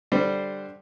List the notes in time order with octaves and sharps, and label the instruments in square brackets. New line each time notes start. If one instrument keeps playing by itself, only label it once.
[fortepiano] D3 G3 C5